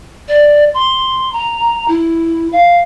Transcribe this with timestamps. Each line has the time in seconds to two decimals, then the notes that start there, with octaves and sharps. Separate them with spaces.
0.28 D5
0.74 C6
1.32 A#5
1.88 E4
2.52 F5